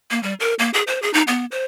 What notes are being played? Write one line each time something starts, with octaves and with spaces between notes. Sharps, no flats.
A#3
G3
A#4
A#3
G#4
C5
G#4
D#4
B3
C5